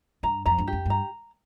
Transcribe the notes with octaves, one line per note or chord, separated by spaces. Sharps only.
G2 A#5
F2 A#5
G2
G4
F2
G2 A#5